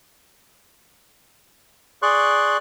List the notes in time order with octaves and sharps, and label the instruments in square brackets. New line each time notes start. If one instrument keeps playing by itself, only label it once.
[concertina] G#4 D5 C6 C#6 F#6